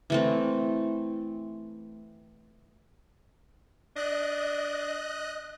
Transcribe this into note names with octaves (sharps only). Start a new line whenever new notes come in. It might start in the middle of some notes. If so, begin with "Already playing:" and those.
E3 A3 C4
D4 D#5 F#6